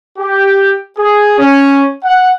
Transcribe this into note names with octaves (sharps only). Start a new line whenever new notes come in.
G4
G#4
C#4
F#5